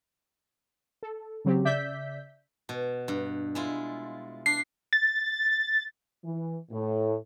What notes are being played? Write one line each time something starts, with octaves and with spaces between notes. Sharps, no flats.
A4
C#3 F#3 C4 G4
C#3 D5 E5 G6 B6
B2
G2
G#3 E4 F4
D4 C7
A6
E3
A2